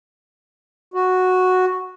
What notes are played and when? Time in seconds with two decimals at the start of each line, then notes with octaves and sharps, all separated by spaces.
0.94 F#4